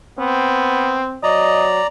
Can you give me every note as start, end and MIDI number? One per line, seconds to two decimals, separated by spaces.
0.19 1.02 59
0.19 1.18 60
1.23 1.80 54
1.23 1.87 74
1.23 1.66 75
1.23 1.87 82